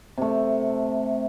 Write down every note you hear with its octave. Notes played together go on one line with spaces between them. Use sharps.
C3 A3